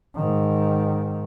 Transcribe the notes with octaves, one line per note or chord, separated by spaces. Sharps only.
G#2 D#3